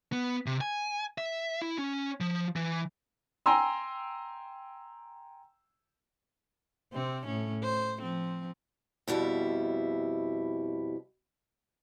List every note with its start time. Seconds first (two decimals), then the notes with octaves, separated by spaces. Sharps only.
0.12 B3
0.46 C3
0.61 G#5
1.18 E5
1.62 E4
1.78 C#4
2.21 F3
2.56 E3
3.46 G5 G#5 A#5 C6 E6
6.93 C3 C4
7.27 A2 C#4
7.63 C5
8.00 F3 C4
9.08 F2 B2 G3 E4